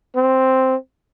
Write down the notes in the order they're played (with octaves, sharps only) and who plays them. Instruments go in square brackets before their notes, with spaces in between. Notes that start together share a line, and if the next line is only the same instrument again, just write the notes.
[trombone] C4